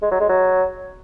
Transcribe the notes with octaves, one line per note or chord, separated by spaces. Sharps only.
G#3
F#3
G#3
F#3